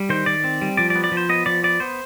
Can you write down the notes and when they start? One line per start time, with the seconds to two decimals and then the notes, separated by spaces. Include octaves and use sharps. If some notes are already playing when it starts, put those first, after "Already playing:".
Already playing: G3
0.09 D#3 C5
0.26 D#3 D5
0.44 C4
0.61 G3
0.77 F3 D5
0.90 D5
0.95 B3
1.04 D5
1.12 F3
1.17 C5
1.29 B3 D#5
1.46 F3 D5
1.63 B3 D5
1.80 B3 C5